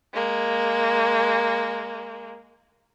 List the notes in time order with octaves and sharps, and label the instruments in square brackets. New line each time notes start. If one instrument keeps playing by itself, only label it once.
[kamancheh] G#3 A#3